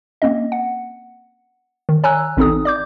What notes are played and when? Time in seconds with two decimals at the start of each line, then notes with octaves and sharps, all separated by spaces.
0.22 A#3 C4 C#4 D#5
0.52 F#5
1.89 D#3
2.04 C#5 G#5 A#5 E6 F#6
2.37 A1 C4 D#4 A4 D#6
2.65 D5 D6 G6